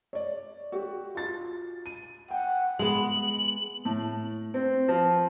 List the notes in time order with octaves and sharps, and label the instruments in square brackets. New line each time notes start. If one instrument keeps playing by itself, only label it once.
[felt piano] C#5 D5
F#4 G4
F4 A6
D#7
[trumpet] F#5 [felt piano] G5
[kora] G#3 B3 [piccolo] F#7
[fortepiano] A2
C4
F3